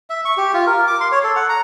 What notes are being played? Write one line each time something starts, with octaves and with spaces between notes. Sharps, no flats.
E5
C#6
G4
F4
A#4
D6
C6
C#5
A4
F#5
A#5